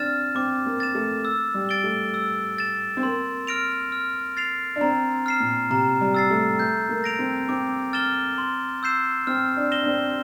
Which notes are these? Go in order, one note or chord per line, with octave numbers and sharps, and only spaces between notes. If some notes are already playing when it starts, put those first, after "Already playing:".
Already playing: C4 D4 F6 A6 E7
C4 D6
A#3
A6 E7
A3
E6
G3
A6 D7 G7
A3
E6
A6 E7
C4
A#3 C6
F6 A#6 D7 F7
F6
A6 C7 F7
D4
C4 A#5
F6 C7 E7
A#2
C3 A#5
G3
E6 A6 C7
A3
A3 G6
A#3
A#6 D7 F7
C4
C4 D6
F6 A6 E7 G7
C6
E6 G6 C7 E7
C4 F6
D4
A#6 E7 G7
D4
C4